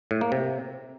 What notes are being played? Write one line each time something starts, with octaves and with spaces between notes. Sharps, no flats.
A2
A#3
C3